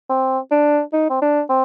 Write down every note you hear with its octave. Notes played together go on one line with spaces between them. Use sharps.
C4
D4
D#4
C4
D4
C4